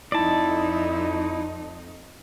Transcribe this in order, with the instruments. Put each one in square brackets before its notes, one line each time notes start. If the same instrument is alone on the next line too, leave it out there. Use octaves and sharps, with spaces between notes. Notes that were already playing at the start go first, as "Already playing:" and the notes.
[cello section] F2 D#4 [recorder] E4 [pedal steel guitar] D5 A5